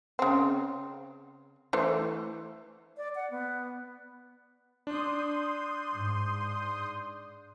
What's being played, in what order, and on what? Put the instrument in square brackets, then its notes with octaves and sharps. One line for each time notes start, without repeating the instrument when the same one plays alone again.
[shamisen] C#3 C4
E3 A3 C5
[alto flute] D5
F#5
B3
[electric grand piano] D4 [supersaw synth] C6 D#6 G6
[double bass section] G#2